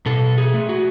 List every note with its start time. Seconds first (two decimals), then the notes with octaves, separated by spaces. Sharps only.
0.06 B2 A4
0.38 G#4
0.54 A3
0.69 F#4